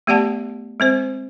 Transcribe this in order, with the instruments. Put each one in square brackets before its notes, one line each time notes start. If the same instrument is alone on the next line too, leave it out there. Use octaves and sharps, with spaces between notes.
[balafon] A3 B3 G4 D5 F#5 A5
G#3 C4 C5